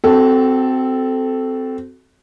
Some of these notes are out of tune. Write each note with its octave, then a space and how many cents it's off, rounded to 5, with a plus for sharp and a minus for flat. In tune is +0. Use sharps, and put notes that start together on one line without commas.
C4 -10 F#4 +20 A4 -5